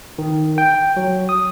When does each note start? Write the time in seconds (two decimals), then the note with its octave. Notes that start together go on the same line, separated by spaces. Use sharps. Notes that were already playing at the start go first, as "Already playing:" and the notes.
0.18 D#3
0.58 G5
0.97 F#3
1.29 D#6